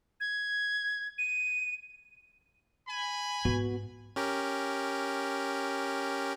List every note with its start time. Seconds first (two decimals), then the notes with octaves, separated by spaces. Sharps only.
0.20 G#6
1.18 D#7
2.88 G#5 B5
3.45 G#2 B3 F4 F#4
4.16 C#4 G4 A#4